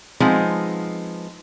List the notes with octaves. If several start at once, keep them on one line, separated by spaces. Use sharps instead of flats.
F3 G#3 B3 C4 D#4